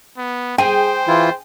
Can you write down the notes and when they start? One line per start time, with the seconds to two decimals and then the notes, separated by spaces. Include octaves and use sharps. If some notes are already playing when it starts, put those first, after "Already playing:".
0.17 B3
0.58 G#4 C5 G5
1.08 E3 E4 F4